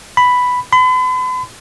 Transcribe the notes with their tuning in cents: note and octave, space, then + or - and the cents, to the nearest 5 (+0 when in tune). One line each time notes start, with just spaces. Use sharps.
B5 +5
B5 +45